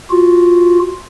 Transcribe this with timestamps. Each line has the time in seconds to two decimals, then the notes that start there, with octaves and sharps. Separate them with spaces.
0.10 F4 F#4